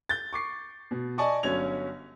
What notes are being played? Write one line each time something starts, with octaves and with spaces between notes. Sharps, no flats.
G6 A6
C#6 D6 C7
B2
D5 D#5 G#5 A5 C#6 D6
G1 F#3 C#4 G#6 F7